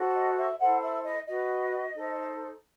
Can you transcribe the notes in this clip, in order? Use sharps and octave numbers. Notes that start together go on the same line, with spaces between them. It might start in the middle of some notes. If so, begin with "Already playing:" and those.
Already playing: F#4 A4 C5
D#5
E5
E4 A4 C5 F#5
E5
D#5
F#4 B4 D#5
D#4 A4 C5